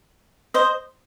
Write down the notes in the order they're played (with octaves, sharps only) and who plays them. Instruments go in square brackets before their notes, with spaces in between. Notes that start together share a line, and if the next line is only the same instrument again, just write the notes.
[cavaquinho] C5 D#5